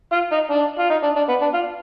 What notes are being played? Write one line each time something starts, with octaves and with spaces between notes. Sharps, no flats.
F4
D#4
D4
F4
D#4
D4
D4
B3
D4
F4